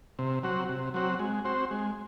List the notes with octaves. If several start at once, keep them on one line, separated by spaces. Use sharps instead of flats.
C3
F#3 C4 F#4
C3
F#3 C4 F#4
G#3
C4 F#4 C5
G#3